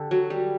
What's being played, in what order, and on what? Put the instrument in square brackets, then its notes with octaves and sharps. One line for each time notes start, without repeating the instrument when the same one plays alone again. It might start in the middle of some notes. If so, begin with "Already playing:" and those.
Already playing: [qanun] D3 D4 G4 A4
F#3
G3